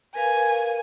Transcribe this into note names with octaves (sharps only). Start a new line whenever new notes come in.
A#4 B4 F5 G#5